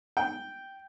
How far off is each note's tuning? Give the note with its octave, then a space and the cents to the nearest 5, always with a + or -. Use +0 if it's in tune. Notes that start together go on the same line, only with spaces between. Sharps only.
G5 -5